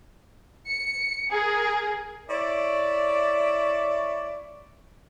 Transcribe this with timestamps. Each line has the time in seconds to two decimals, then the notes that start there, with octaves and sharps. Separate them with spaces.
0.67 C#7
1.31 G#4 A#4
2.30 E4 C#5 D5